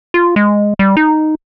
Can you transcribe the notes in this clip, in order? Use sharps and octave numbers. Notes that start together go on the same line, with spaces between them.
F4
G#3
G3
D#4